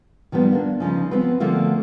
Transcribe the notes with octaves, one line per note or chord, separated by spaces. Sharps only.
D#3 F3 G3 B3
A#3 D4
C#3 F3 C#4 D#4
F3 B3 C4 B4
D3 F3 A3 A#3 C4 F#4